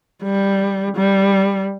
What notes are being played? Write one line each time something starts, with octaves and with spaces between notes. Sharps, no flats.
G3
G3